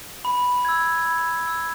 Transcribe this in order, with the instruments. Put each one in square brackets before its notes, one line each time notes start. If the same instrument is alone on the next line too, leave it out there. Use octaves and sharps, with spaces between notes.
[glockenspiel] B5
E6 G#6
B5
E6 G#6